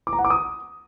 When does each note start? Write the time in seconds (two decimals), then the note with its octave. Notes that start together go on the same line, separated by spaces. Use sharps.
0.07 D6
0.13 A#5
0.19 F#5
0.25 D6
0.30 D#6